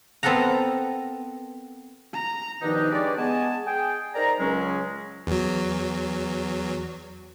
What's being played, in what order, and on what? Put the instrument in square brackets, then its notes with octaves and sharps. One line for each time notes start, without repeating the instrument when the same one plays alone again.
[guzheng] B3 C4 A4 A#4 F#5 A#5
[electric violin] A#5
[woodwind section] G2 B2 D#3 F3 D4 D#4
G3 G#3 D4 B4 C#5 D5
G#3 B3 G#5 A5
G#4 G5
D#4 A#4 C5 D5 A#5
C#2 F#3 G#3 C#4
[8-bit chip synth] E2 F#3